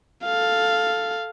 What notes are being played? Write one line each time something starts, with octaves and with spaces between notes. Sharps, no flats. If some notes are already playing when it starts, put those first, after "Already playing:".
A4 F5